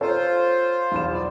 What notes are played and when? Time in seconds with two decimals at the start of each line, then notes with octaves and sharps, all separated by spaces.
0.01 F4 A4 C5 C#5 A#5
0.92 B1 E2 E7
1.14 D5